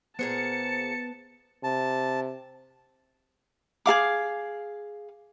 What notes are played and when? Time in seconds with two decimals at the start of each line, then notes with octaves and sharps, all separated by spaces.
0.19 A#2 B3 G#4 C5 A5 C#7
1.64 C3 A5
3.86 G#4 A4 F5 D6